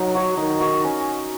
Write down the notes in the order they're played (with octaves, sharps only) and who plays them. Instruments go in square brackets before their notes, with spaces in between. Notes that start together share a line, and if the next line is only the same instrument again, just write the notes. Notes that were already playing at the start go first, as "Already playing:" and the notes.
Already playing: [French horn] F#3 [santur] D#4
[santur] F#4 C#5
[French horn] D#3 [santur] D#4
[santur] F#4 C#5
C#4